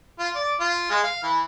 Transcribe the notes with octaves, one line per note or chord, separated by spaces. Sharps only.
F4
D5
F4
G#3
F5
E3